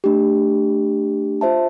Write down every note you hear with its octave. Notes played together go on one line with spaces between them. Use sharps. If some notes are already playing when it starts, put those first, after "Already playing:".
A3 D4 G4
F4 C5 E5 A5